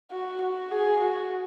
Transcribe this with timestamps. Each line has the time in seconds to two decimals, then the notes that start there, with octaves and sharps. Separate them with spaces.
0.11 F#4
0.41 F#4
0.71 G#4
1.00 F#4